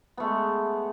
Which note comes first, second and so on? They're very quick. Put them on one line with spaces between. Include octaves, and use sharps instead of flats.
B3 A3 G#3